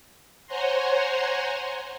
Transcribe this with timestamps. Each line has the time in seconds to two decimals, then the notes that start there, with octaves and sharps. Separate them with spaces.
0.47 C5 C#5 F#5 G#5 A#5 C6